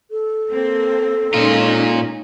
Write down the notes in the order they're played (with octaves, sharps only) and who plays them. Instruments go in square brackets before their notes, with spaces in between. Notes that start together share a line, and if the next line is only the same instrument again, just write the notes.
[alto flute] A4
[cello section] A#3 C4
[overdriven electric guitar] A#2 F4 [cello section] G#3 C#4 D#4